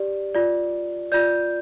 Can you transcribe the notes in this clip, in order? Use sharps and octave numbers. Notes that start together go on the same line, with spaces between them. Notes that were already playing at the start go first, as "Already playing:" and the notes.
Already playing: G4 D5
F4 D5
F4 D5 G6